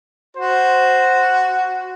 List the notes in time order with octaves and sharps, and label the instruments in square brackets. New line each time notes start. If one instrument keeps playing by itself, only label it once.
[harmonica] F#4 [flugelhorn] C5